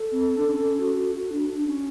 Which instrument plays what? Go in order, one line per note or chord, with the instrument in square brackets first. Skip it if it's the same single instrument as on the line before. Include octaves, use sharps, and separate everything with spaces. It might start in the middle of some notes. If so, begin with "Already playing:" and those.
Already playing: [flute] A4
[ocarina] C4
D4
C#4
F#4
F#4
D4
D4
C#4